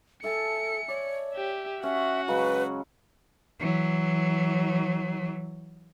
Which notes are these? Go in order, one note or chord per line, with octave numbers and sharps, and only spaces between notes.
A4 E5 G#5 A5 C#7
C#5 D5
G4 E5
C#4 F#4 E5 F#5
C#3 F#3 G#3 B4
E3 F#3